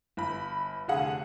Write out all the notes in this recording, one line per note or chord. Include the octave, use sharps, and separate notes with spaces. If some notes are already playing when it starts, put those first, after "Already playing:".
G1 B5
F1 D3 G#4 F#5